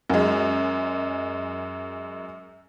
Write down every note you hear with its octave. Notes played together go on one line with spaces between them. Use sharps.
F#2 G#3